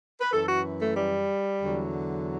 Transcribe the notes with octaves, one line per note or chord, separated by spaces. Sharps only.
B4
F#2 E3 A4
F#4
A3
G3
E2 D3 F#3